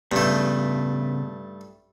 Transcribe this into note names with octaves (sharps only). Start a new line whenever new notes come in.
G2 C#3 A3 B3